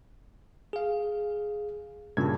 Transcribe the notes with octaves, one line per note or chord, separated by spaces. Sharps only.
G#4 F5
G2 A#2 C#3 A5 G#6